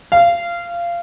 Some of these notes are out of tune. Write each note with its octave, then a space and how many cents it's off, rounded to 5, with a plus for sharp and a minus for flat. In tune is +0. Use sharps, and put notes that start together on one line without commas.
F5 -20